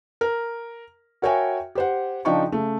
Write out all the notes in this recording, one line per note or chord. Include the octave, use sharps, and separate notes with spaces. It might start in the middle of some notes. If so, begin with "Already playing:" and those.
A#4
F#4 A#4 C#5 E5 G5 G#5
G4 C5 F#5
C#3 F3 D4 D#4 G5 C#6
C#3 A3